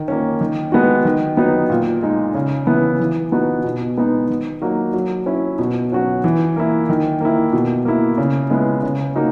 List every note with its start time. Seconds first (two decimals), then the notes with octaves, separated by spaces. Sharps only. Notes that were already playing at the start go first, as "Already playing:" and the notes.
Already playing: D#3
0.08 A#3 C#4
0.41 D#3
0.72 G#3 B3 F#4
1.05 D#3
1.37 F#3 B3 D#4
1.70 A#2
2.02 G#3 D#4
2.34 C#3
2.67 E3 B3 E4
3.00 E3
3.32 B3 D#4 F#4
3.64 B2
3.97 G#3 B3 D#4 F#4
4.29 D#3
4.62 F#3 A#3 D#4 F#4
4.94 F#3
5.26 C#4 E4
5.59 B2
5.92 F#3 C#4 F#4
6.24 E3
6.56 A#3 E4
6.89 D#3
7.20 A#3 E4
7.53 B2
7.85 A#3 E4
8.18 C#3
8.50 G#3 B3 E4
8.83 C#3
9.15 A#3 D#4 F#4